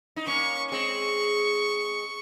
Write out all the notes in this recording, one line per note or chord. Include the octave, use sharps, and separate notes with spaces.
D#4
A#3 C#4 C#6
G#3 C4 C#6